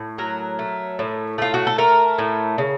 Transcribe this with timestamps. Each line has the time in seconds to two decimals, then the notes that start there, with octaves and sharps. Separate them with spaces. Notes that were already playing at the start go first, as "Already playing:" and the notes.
Already playing: A2
0.18 F#3 A#4
0.59 A3
0.99 A2
1.38 A3 F4
1.54 F#4
1.67 A4
1.78 A3 A#4
2.18 A2
2.58 C#3